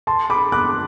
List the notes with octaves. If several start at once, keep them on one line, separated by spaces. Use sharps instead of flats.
A5 C6
B5 D6
D6 F#6